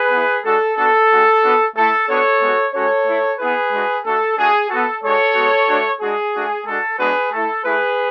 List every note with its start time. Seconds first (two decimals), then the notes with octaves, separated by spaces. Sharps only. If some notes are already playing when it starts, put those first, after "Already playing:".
Already playing: G#4 B4
0.12 B3 E4
0.45 G#3 D4 F#4 A4
0.77 B3 D4 F#4 A4
1.11 G#3 C#4 F#4
1.42 B3 D4 F#4
1.76 A3 E4 A4
2.08 B3 D4 F#4 A4 C#5
2.41 G#3 B3 F#4
2.74 G#3 C#4 F#4 A4 C#5
3.07 A3 E4
3.39 B3 E4 G#4 B4
3.72 G#3 D4 F#4
4.05 A3 D4 F#4 A4
4.38 A3 D4 F#4 G#4
4.69 F#4 A4
4.75 B3
5.02 G#3 D4 F#4 A4 C#5
5.35 G#3 B3 F#4
5.68 A3 D4 F#4
6.01 G#3 D4 F#4 G#4
6.34 A3 D4 F#4
6.66 G#3 D4 F#4 A4
6.99 G#3 B3 D4 F#4 G#4 B4
7.32 A3 E4 A4
7.64 A3 E4 G#4 B4